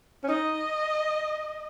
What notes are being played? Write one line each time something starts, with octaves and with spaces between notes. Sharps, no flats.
C#4
D#4 D#5